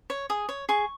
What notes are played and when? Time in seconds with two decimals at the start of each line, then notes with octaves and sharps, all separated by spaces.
0.10 C#5
0.30 G#4 D#6
0.49 C#5
0.69 G#4 C#6